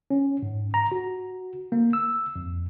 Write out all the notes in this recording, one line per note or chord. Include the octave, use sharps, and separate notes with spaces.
C#4
G#2
A#5
F#4
A#3
E6
F2